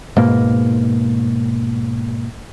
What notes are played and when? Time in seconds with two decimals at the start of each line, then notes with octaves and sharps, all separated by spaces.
0.16 G#2 B2 A#3